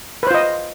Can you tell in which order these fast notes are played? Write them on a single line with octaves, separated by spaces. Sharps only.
B4 C5 F4 D#5